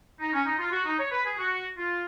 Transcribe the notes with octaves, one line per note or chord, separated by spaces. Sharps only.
D#4
C#4
D#4
F4
F#4
D#4
C#5
B4
G#4
F#4
F4